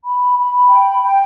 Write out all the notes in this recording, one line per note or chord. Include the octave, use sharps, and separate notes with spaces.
B5
B5
G5
G5